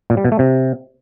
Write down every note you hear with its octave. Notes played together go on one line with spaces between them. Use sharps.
A#2
G3
B2
A3
C3